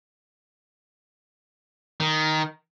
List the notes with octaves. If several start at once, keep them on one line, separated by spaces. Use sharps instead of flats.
D#3